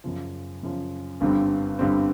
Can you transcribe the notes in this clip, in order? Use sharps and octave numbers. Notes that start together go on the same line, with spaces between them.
F#2 C#3 F3
F#2 C#3 F3
G1 G2 D3 G3 C4
G1 G2 D3 G3 C4